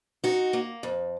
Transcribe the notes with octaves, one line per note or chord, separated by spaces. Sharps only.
D#4 F#4
A#3
F2